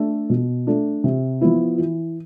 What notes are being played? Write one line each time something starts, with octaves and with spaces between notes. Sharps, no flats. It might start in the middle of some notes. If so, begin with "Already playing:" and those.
Already playing: A3 D4 A4
B2
A3 D4
C3
F3 B3 E4
E3